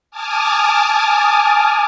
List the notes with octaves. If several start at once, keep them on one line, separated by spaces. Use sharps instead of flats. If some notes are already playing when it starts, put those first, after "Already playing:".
G#5 A5 D6 D#6 F6